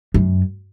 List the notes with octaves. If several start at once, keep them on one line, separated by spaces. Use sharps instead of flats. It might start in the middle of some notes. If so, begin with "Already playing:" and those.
F#2